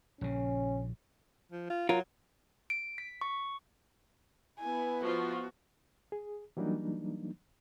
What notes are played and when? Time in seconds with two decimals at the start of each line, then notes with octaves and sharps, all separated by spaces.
0.21 A#1 C#3 C#4
1.52 F3
1.70 F4
1.89 F#3 F4 A#4
2.70 D7
2.98 B6
3.21 C#6
4.60 B3 E4 G#5
5.04 F3 F4 F#4
6.12 G#4
6.57 E3 F#3 G3 A#3 D4 D#4